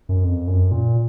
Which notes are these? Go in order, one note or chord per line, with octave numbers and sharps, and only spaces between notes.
F#2
F2
F#2
A#2